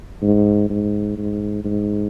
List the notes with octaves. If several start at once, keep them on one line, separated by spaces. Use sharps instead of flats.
G#2
G#2
G#2
G#2